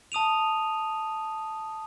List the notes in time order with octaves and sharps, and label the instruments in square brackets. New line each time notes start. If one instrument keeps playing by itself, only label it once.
[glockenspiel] A5 D#6 D#7 F7